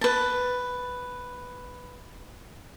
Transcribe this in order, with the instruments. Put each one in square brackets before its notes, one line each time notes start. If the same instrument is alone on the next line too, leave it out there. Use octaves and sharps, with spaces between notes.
[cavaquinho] B4 A5